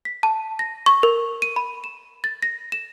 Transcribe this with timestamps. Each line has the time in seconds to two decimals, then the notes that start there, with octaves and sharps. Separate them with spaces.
0.05 B6
0.23 A5
0.59 A#6
0.86 C#6
1.03 A#4
1.42 D#7
1.56 B5
1.84 E7
2.24 A6
2.42 A#6
2.72 E7